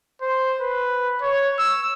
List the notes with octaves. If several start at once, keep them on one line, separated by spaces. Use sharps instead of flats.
C5
B4
C#5
E6